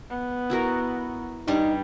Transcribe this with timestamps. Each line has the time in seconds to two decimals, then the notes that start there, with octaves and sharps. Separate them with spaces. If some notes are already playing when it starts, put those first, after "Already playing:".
0.10 B3
0.50 E4 F#4 A#4
1.48 G2 G3 D#4